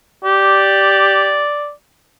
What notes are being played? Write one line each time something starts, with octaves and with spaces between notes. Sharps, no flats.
G4 D5